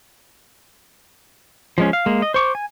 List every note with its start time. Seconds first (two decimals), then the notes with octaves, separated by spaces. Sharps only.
1.78 F3 G#3 C#4
1.93 F5
2.06 G#3 A#3
2.22 D#5
2.34 C5 C#6 D6
2.55 G#5